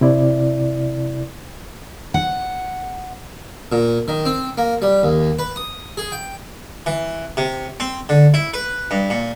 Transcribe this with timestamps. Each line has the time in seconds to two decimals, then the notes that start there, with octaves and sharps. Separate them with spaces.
0.01 C3 E4 D5
2.14 F#5
3.72 A#2
4.08 D#3
4.25 C4
4.58 A#3
4.82 G3
5.03 D#2
5.39 B4
5.56 D#6
5.97 G#4
6.12 G5
6.86 E3
7.37 C3
7.80 C4
8.09 D3
8.34 E4
8.54 B4
8.91 G2
9.10 A#2